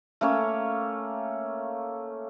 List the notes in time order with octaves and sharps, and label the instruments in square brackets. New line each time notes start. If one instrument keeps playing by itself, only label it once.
[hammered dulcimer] A3 A#3 C#4 C#5